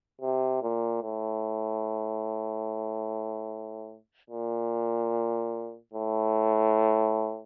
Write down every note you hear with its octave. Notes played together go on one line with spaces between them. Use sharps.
C3
A#2
A2
A#2
A2